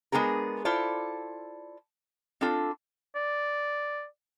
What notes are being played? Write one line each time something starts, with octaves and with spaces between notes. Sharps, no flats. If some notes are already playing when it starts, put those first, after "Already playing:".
G#3 B3 D4 G#4 A#4
E4 F4 A4 C5 D5
C4 D4 F4 A4
D5